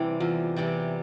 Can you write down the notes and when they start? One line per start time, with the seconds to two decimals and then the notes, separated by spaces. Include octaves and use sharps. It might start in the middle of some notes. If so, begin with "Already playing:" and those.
Already playing: C3 E3 G3 E4
0.20 E2 F4
0.56 C3 E3 G3